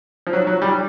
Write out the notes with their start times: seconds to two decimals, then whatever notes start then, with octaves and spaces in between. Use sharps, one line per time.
0.27 F3
0.33 F#3
0.47 F#3
0.62 G3